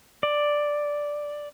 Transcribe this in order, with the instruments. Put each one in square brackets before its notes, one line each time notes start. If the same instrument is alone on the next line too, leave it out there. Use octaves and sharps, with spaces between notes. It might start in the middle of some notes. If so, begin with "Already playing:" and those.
[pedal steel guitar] D5